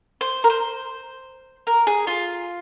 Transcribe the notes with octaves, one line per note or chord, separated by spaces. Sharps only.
C5
A#4
C5
A#4
G#4
F4